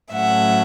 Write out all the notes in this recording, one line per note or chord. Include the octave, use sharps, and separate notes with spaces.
A2 F#3 A3 C#4 E5 F#5